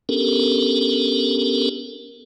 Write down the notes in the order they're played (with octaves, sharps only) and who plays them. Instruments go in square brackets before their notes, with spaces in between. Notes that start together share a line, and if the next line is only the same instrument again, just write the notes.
[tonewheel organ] B3 C#4 D4 G4 A4 A#4